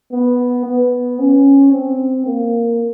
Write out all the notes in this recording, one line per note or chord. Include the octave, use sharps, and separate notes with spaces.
B3
B3
C#4
C4
A#3